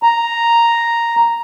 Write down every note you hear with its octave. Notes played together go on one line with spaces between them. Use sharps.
A#5